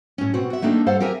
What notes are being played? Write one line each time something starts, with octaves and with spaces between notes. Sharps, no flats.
A2 C#4
B2 C4 F#4
F#4 E5
A3 A#3 C4 D4 D#4
G2 A4 C5 F5 F#5
C4 G4 A#4 E5 G#5